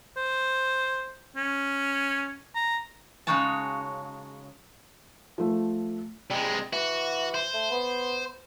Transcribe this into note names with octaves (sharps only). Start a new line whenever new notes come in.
C5
C#4
A#5
C#3 G#3 D#4 F#4 C#5 A5
F3 A3
C3 G3 G#3
E3 F#4
C5
A3
B3